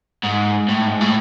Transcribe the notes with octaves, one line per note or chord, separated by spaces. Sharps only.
G#2
A2
G#2
A2